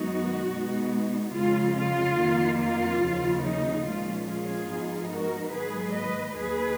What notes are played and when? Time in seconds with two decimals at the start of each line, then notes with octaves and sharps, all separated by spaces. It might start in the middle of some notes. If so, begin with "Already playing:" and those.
Already playing: F#2 D#3 G#3 B3 D#4 F#4
0.49 B2 G#3 B3 D#4
1.34 F2 C#3 G#3 F4
1.76 F4
2.18 F2 D#3 A#3
2.59 F4
3.02 D#2 C#3 F3 A#3
3.44 D#4
3.86 A#2 F3 G#3 C#4 F4
4.28 F4 G#4
4.70 G#2 F3 B3 D#4
5.12 F#4 A#4
5.54 G#2 D#3 F#3 A#3 G#4 B4
5.95 B4 D#5
6.38 D#2 D#3 A#3 G#4 B4